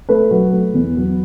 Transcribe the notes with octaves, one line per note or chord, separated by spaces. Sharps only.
A3 B4
F#3
A3
E2
F#3